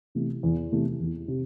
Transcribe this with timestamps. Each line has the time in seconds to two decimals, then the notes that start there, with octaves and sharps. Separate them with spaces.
0.15 C3 E3 A3
0.43 E2
0.72 C3 E3 A3
1.00 E2
1.28 C3